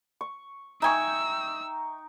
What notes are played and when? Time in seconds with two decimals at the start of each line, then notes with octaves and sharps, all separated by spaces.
0.21 C#6
0.82 D#4 E5 G5 G#5 C#6 E6